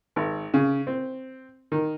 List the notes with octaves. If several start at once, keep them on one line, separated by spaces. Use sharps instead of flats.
G#1
C#3
C4
D#3